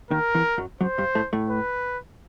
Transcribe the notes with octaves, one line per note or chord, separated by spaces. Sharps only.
D#2 D#3 A#4
E2 E3
F#2 F#3
F#2 F#3 C5
G2 G3
A2 A3
A2 A3
B4